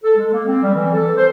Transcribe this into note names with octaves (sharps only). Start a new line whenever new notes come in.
A4
G#3
A#3
C4
G3
E3
A4
C5